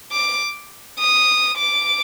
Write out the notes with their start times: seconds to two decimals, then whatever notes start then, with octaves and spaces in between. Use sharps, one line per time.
0.12 D6
0.99 D#6
1.58 D6